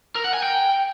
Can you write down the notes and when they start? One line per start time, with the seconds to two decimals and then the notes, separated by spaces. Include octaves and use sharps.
0.15 A#4
0.25 F#5
0.34 G#5
0.43 G5